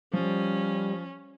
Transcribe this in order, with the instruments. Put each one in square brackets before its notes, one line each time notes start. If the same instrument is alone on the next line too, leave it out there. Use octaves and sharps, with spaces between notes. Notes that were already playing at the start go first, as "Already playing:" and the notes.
[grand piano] F3 [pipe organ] G3 [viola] C#4